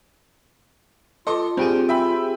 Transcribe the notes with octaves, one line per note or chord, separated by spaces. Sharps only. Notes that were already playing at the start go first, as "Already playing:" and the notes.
F4 A4 D#5 C6 D6
G2 C4 G4 G#4
E5 G5 B5